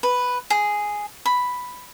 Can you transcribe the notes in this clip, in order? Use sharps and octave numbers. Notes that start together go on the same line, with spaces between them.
B4
G#4
B5